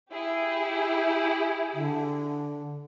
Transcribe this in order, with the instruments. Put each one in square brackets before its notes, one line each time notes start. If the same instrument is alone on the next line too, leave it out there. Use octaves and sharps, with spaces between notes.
[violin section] E4 G4 G#4
[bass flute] D3